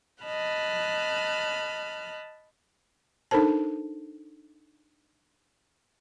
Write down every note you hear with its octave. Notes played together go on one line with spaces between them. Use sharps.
D#5 A5 B5 F6 F#6
D4 D#4 A4 A#4 C5 A5